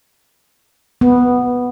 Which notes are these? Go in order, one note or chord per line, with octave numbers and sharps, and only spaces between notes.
B3